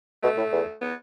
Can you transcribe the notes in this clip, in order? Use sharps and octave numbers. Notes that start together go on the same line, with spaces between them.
B2 A3
A2
E2
B3